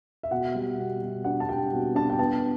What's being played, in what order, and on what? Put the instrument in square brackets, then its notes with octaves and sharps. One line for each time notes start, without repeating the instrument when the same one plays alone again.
[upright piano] E5
B2 F#5
G3
B2
B2
D4 F#5
A5
G3 G5
B2
D4 A5
G5
B3 A5